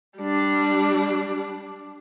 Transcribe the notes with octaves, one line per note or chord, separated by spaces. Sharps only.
G3 D4